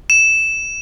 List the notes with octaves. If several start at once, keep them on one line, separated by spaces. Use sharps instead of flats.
E7